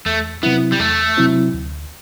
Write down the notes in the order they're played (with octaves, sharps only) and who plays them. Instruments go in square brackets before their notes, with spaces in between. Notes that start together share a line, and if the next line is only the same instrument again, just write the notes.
[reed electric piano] E2 [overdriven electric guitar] A3
[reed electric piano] C3 F#3 C4 E4 [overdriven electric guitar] B3
[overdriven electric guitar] G3
[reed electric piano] E2 [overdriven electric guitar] A3
[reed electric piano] C3 F#3 C4 E4
D2